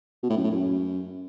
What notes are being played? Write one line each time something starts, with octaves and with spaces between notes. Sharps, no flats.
B2
A2
F#2
A2
F#2